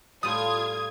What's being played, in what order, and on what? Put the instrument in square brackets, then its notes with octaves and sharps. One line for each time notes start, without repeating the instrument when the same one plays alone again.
[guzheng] A2 G3 [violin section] F4 G#6 [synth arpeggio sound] D#6